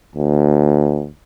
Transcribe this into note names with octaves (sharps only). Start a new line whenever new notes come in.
D2